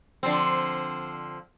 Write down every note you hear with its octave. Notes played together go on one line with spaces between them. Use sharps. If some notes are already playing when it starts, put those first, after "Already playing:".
D3 F3 C4